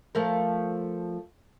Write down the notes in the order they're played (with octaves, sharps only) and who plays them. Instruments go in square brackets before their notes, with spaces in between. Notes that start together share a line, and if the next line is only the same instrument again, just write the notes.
[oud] F3 A3 A#4